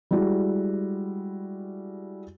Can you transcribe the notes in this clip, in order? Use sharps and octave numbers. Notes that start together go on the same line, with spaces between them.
G3 G#3 E4 F#4